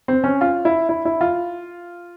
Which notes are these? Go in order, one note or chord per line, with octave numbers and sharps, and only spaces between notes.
C4
C#4
F4
E4
E4
E4
F4